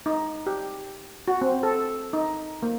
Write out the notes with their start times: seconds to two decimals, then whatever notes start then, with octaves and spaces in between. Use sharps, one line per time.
0.06 D#4
0.47 G4
1.28 F#4
1.41 C4
1.63 A4
2.13 D#4
2.63 A#3